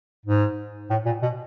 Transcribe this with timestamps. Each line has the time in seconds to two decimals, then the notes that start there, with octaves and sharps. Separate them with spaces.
0.26 G#2
0.90 A2
1.06 A#2
1.23 B2